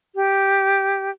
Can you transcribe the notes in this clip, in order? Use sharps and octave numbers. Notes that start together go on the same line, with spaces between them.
G4